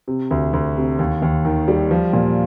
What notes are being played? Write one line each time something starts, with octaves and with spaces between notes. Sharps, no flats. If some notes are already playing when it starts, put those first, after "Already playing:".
C3
D2
D2
C3
D#2
D#2
D#3
G3
F3
A#2